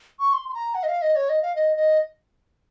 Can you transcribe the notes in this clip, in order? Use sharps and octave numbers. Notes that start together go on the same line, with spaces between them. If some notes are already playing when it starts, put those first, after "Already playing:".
C#6
C6
C6
A#5
F#5
D#5
F5
D#5
C#5
D#5
F5
D#5
D#5